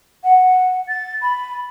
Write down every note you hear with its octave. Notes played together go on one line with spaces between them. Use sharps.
F#5
A6
B5